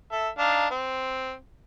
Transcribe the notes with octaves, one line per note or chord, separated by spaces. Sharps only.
A4 E5
D4 D#4 F5
C4